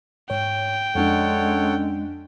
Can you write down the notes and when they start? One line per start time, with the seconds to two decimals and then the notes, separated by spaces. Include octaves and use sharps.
0.30 G#2 C#5 G5
0.95 F2 G#3 C#4 D4 A4 C#5 F#5